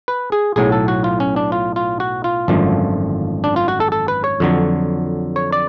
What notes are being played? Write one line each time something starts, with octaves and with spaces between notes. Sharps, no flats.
B4
G#4
B1 A2 F#3 G#4
A4
F#4
F4
C#4
D4
F4
F4
F#4
F4
G#1 F#2 D3 F3 A3
D4
F4
F#4
A4
A4
B4
C#5
F2 D3 F#3
C#5
D5